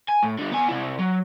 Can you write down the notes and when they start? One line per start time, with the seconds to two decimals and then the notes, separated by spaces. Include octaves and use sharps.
0.09 G#5
0.23 A2
0.39 D3 G3
0.51 B3 G#5
0.68 C3 E4
0.99 F#3